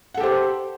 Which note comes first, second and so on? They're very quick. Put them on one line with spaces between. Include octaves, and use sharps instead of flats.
F#5 A4 G4 C5